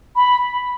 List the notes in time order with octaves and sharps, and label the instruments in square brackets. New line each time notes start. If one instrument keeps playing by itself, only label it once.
[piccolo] B5